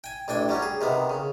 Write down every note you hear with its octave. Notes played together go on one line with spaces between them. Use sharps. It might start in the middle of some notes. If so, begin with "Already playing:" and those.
G5 G#5
A1 D4 G5 G#5
F#3 G3 C#4
G#4
C3 D#3 B3
C#3